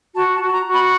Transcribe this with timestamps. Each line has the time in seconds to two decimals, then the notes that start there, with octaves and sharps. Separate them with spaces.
0.15 F#4 A5
0.34 A5
0.40 F#4
0.47 A5
0.53 A#5
0.65 F#4
0.73 B5